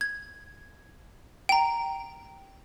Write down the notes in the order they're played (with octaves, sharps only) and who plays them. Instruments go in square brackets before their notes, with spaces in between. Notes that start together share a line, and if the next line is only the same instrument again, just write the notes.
[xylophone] G#6
G5 A#5